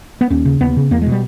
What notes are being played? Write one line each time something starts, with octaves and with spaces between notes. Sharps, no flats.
B3
D#2 C#4
C#3
D#2 B3
C#3
E2 A#3
G#3
B2
G3